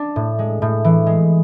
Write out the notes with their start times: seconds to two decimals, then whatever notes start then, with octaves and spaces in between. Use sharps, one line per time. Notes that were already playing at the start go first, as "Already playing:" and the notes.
Already playing: D4
0.16 A2
0.39 G#3
0.62 A2
0.85 E3
1.06 G#3